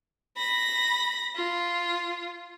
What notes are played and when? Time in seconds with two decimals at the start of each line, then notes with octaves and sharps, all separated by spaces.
0.37 B5 A#6
1.35 F4